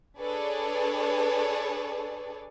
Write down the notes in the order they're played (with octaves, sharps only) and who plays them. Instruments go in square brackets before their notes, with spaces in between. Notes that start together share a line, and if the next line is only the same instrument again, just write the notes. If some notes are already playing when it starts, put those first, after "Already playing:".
[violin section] D4 G#4 A4 B4 C#5 D5